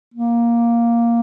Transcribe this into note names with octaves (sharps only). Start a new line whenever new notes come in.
A#3